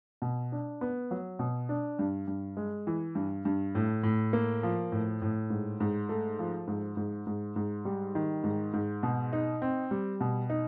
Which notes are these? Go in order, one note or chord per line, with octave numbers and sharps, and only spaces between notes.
B2
D4
B3
F#3
B2
D4
G2
G2
G#3
E3
G2
G2
A2
A2
A#3
F3
A2
A2
G#2
G#2
A3
F3
G#2
G#2
G#2
G#2
G3
D#3
G#2
G#2
B2
D#4
C4
G3
B2
D#4